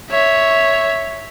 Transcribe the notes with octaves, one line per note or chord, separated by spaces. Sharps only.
C#5 E5